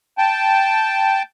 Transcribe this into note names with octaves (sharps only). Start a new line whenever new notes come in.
G5 A5